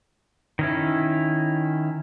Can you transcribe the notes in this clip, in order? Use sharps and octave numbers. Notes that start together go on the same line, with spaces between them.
D#3 C#4 E4